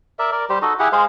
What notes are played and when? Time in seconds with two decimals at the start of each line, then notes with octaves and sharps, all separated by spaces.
0.19 A#4 D5 E5
0.32 A#4 D5
0.50 G3 G4 C5
0.62 D#4 F#4 A4 D#5
0.79 E4 G4 G#4 F#5
0.92 G#3 G#4 C5 F5